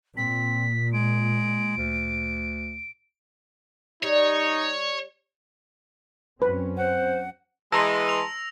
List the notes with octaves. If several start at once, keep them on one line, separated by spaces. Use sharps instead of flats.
A#2 C4 B6
G#3 D7
D2
G3 D#4 C#5
F#2 C4 C#4 B4
C5 F#5
E3 G#3 A5 A#5 C6 E6 A#6
E6 F7